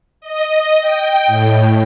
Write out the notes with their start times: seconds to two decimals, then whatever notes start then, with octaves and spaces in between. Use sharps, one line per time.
0.21 D#5
0.81 G5
1.27 A2